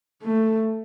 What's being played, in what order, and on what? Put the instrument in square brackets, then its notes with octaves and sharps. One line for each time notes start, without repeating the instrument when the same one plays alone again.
[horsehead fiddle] A3